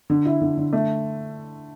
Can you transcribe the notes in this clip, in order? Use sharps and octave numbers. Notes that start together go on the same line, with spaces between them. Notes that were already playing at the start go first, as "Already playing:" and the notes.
D3
E4
D3
D3
A3